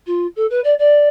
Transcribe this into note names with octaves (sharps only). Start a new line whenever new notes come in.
F4
A4
B4
D5
D5